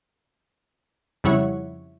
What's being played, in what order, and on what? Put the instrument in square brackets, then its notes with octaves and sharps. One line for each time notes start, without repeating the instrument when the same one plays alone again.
[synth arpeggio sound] F2 C#3 G3 E4 C#5 F#5